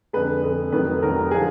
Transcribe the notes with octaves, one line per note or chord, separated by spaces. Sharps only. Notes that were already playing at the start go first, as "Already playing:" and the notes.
F2 D3 G#3 B4
F2 D3 G#3
F1 F2 D#3 F#3 B4
F1 F2 D#3 F#3 A#4
D3 F3 G#3 G#4